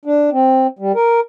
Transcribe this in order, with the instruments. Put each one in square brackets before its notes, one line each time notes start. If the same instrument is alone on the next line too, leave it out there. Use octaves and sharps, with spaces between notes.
[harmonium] D4
C4
G3
A#4